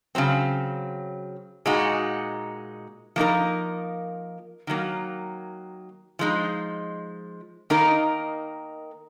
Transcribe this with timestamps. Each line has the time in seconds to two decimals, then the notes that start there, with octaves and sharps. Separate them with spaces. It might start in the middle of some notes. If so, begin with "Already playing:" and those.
0.15 C#3 F#3 C4
1.66 A#2 G#3 D#4 F#4
3.16 F3 A#3 D#4 A#4
4.67 D#3 F#3 A#3
6.19 F3 G#3 D#4
7.70 D#3 A#3 D#4 A#4